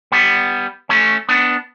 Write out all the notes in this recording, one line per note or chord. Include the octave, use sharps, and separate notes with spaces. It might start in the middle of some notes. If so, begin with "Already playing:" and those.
G3 B3
A3 C#4
B3 D4